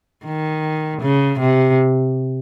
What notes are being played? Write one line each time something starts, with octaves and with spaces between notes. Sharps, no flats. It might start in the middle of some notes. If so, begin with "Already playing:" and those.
D#3
C#3
C3